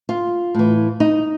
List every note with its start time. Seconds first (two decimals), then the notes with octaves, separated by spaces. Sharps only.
0.09 F4
0.54 A2 E3
1.00 D#4